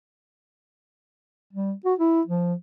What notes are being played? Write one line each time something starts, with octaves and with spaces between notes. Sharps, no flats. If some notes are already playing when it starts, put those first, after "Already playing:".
G3
F#4
E4
F3